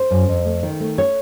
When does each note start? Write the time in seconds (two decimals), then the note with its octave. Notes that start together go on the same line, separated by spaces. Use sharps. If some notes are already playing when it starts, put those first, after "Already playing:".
Already playing: C5
0.11 F#2
0.29 F2
0.45 A3
0.63 D#3
0.80 A3
0.98 C#5